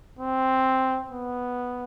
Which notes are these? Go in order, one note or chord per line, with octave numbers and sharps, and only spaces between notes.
C4
B3